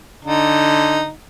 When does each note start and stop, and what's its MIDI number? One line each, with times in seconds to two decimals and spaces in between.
0.25 1.10 50
0.25 1.10 63